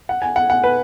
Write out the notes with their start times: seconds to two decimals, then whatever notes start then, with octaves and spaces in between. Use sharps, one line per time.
0.09 F#5
0.22 G#5
0.36 F#5
0.50 F#5
0.64 B4